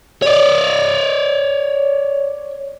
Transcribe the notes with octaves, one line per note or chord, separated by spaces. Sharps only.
C#5 D5